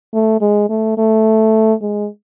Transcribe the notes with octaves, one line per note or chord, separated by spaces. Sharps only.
A3
G#3
A3
A3
G#3